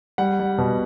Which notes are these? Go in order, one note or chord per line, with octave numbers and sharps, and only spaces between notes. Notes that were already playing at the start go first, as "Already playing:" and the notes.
G3 F#5
G3
B2